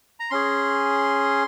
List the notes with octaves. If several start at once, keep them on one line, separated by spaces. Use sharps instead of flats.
A#5
C#4 G#4 C6